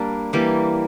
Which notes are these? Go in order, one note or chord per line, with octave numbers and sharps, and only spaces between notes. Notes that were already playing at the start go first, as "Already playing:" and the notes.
Already playing: G3 A#3 D4
E3 G3 A#3